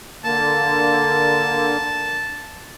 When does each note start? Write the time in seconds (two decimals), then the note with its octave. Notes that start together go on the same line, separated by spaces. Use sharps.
0.24 D3 A#3 A5